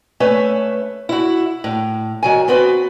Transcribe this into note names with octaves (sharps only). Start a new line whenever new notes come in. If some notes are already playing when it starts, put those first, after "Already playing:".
A3 C#4 B4 E5
E4 F#4
A2
D#3 F#3 G#5
B3 C4 F#4 B4